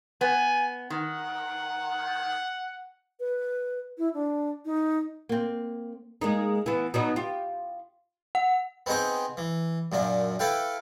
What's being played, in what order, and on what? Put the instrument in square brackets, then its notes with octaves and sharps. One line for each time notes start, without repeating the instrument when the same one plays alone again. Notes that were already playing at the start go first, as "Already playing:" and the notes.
[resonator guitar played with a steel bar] B3 [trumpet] G#5
[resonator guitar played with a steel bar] D#3 [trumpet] F#5
[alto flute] B4
E4
D4
D#4
[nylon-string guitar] A#3 C4
[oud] G#3 A#3 D#4
E3 B3
B2 F#3 D#4
F4 G4
[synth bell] F#5
[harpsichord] B3 C4 D#4 G#4 C5
E3
F#2 A#2 D4
E4 A4 B4 F5 G5